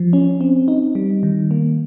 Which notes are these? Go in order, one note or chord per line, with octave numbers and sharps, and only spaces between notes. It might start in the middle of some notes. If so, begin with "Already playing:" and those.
Already playing: F3
C#4
C4
D#4
G3
D#3
A#3